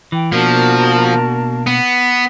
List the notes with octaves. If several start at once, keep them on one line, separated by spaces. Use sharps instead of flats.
E3 G5
B2 F3 A#3 D4 F#4 A#4 A5
B3